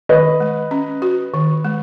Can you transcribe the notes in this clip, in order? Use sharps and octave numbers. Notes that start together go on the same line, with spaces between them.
D#3 B4 D#5
G#3
C#4
F#4
D#3
G#3